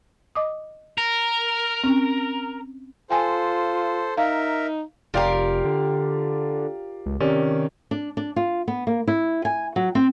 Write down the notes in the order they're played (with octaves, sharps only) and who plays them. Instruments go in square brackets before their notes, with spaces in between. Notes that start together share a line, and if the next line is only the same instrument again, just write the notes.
[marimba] D#5 D6 D#6
[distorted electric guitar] A#4
[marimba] C4 C#4
[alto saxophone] F4 [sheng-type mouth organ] A4 C5 [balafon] G5 G#5
[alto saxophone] D#4 [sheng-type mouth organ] A#4 E5 [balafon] F5
[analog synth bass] F1 [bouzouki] F4 G4 A#4 [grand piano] D5 F5
[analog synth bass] D3
C#2
[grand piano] C3 C#4 D5 [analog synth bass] D#3
[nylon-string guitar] D4
D4
F4
B3
A#3
E4
G#5
F#3
C4